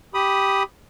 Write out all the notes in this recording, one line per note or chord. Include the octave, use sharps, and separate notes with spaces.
G4 B5 D#6